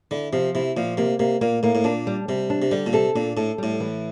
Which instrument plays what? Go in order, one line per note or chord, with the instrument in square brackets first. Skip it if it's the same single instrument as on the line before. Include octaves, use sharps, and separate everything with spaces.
[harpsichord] D3 [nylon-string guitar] E4
[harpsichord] C3 [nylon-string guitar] F3
[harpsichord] C3 [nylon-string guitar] E4
[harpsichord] A#2 [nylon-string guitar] F3
[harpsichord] C3 [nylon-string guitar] A#3
[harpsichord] C3 [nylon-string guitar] A#3
[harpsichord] A#2 [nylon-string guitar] A#3
[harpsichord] A2 [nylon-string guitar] A#3
[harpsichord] A2
[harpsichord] A#2 [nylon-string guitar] D4
[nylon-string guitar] G3
[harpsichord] C3 [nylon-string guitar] G3
[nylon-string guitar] D4
[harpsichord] C3
[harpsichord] D3 [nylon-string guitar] G3
[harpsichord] A#2
[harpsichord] C3 [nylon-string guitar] A4
[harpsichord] A#2 [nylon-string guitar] D4
[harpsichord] A2 [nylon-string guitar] A4
[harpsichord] A2 [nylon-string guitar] G3
[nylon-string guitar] E3